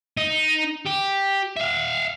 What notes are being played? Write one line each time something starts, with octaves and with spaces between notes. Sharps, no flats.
D#4
G4
E5 F5